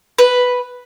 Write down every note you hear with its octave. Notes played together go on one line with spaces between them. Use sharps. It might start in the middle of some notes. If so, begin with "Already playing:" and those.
B4